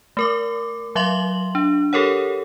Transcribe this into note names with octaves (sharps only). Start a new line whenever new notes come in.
A3 A#4 D6
F#3 E5 F5 C6 F#7
D4
G4 A4 A#4 C#5 F#5